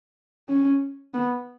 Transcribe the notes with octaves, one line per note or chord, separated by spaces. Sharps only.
C#4
B3